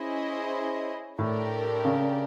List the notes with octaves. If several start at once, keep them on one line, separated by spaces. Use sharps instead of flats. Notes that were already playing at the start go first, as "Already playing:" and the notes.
Already playing: C#4 E4 G#4 C5 D#5
A2 A3 D4 G4 A#4 D5
C#3